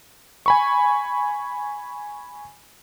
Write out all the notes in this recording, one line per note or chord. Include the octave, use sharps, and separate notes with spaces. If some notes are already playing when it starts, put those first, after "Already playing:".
G#5 B5 C#6